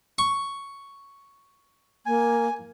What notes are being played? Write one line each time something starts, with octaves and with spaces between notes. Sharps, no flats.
C#6
A#3 G#5